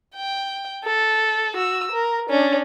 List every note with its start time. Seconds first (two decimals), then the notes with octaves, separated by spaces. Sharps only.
0.16 G5
0.84 A4
1.56 F#4 E6
1.92 A#4
2.30 C#4 D4